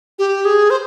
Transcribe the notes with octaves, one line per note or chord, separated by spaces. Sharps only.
G4
G#4
C5